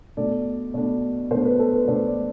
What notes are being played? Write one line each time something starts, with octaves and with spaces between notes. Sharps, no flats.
B2 A3 D4 D5
B2 A3 D4
B2 A3 D4 C5
B4
A4
B4
B2 A3 D4 C5
D5